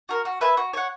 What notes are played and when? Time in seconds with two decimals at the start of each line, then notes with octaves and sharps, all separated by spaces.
0.09 F#4 A#4
0.25 F#4
0.41 B4 E5 G#5
0.57 F#4
0.73 C#5 F#5